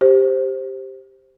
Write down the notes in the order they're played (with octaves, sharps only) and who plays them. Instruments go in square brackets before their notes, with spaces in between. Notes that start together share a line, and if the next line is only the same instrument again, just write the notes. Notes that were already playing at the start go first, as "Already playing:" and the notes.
[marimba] G4 C5